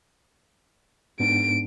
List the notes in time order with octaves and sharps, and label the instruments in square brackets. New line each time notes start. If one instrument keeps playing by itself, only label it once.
[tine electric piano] G#2 B3 D4 [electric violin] D7